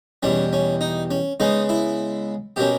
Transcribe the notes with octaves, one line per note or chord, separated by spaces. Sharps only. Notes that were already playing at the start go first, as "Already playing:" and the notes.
E2 B2 G3 C#4
C#4
D#4
C#4
C#3 G#3 B3 D#4
E4
B2 A#3 C#4 G4